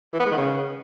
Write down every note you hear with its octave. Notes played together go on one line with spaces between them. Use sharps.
E3
B3
G#3
D#3
C#3